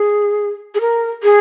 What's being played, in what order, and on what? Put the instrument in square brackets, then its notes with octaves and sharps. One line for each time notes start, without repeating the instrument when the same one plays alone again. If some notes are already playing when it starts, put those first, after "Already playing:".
Already playing: [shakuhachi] G#4
G#4
A#4
G#4